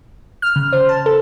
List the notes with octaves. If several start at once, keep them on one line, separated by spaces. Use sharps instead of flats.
F6
C#3
C5
A5
A4